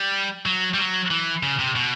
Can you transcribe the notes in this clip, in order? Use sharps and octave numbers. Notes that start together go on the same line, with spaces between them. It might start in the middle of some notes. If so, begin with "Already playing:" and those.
Already playing: G3
F#3
G3
F#3
E3
C#3
C3
B2